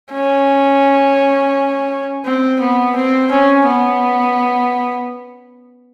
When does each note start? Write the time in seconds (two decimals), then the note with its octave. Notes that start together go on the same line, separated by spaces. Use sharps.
0.13 C#4
2.25 C4
2.61 B3
2.96 C4
3.32 C#4
3.67 B3